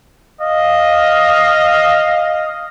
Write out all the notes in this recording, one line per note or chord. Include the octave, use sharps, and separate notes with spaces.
D#5 F5